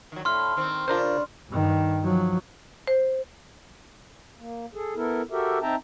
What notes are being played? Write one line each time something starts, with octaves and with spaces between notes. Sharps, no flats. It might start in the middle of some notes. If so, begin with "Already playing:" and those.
D#3 F#3
A2 C6 F6
D#3 C4
C#3 D4 F4 A#4 C5
G2 D#3
F3 F#3
C5
A#3
G#4 A4
B3 E4 A4 A#4
F#4 G4 A4 A#4 E5
C4 D#4 E5 G5 A5 A#5